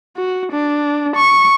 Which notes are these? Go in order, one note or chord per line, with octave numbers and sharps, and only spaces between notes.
F#4
D4
C#6